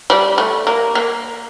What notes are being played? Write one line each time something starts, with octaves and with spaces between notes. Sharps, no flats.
G3
A3
A#3
A#3